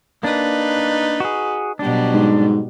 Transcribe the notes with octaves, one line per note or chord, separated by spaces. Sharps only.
A#3 D4 D#4 B4
F#4 G#4
B2 F#3 G3 D4
G#2